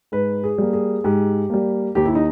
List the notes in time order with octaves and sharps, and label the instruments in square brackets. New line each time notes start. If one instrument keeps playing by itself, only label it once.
[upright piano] G#2 B4
G#4
G3 A#3
G#4
G#2 G4
G3 A#3
D#2 G4
E4
D#4